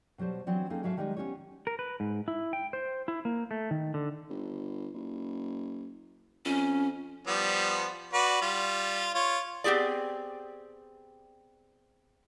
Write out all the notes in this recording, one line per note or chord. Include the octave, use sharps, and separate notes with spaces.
B2 F#3 G3 C5 A5
E3 F#3 B3 C4 D4
A#3 C4 C#4 D#4 G#4 A4
G#2 F#3 E5 F5 G#5 A5
D#3 G3 G#3 D4 D#4
B3 C#4 F#4 G4 C#5
A#4
B4
G#2
E4
G5
C5
E4
A#3
A3
D#3
D3
G1
F#1
F2 C#4
F3 G3 B3
F#4 B4 D5
G3 F4
F4 C#5
B3 C4 G4 G#4 D5